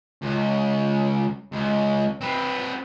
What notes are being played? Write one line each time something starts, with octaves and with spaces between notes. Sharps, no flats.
C#2
C#2
C4 B4